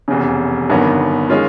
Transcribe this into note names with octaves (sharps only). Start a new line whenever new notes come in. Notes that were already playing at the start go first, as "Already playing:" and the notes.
F1 E2 C#3
G1 G2 D#3 F#3 B3
D#3 G#3 C#4 F4